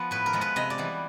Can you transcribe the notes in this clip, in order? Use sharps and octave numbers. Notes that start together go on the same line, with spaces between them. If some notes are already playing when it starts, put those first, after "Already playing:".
Already playing: F3 B3
A2 B4
A#4
F3 G#3 B3
B4
C3 D#5
D5
E3 G3 B3